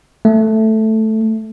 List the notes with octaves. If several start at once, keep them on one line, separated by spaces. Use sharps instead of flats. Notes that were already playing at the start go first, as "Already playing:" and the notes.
A3